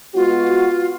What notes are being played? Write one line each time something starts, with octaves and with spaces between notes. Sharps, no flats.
G#3 B3 F4 F#4